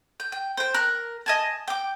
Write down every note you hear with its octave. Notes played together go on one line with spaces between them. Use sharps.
G5
G5
C5 G5
A#4 F#6
D#5 G#5 A5
G5 D6